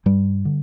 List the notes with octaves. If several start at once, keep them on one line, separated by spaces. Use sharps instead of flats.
G2 G3
D3